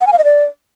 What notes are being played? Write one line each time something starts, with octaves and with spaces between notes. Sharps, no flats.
F#5
G#5
F5
D#5
D5